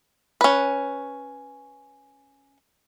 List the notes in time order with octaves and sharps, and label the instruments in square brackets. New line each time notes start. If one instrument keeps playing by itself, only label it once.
[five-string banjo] C#4 B4